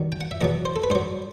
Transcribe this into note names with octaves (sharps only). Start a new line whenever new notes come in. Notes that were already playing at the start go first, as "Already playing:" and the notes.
Already playing: G2 D#3 F#3
G5
F#5
E5
E2 B2 F#3 D#5
C5
A4
B4
G2 F#3 C5